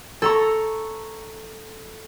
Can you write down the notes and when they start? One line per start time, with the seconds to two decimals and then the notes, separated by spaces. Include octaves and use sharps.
0.22 A4 A#5 C#6